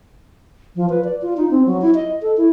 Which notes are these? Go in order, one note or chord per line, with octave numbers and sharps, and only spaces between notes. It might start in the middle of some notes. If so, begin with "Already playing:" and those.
F3
B4
D5
F4
D#4
C4
F#3
E4
D#5
A4
E4